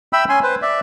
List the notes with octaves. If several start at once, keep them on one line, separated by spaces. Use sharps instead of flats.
E5 G5 B5 E6
C#4 G#5 C6
B4 C5
D5 E5